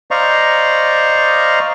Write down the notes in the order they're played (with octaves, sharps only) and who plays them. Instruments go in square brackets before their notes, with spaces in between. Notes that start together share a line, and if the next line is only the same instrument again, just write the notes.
[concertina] C5 D5 D#5 F5 A#5 C#6